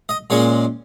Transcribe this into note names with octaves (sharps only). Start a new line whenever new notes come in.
D#5
A#2 G#3 C#4 C#5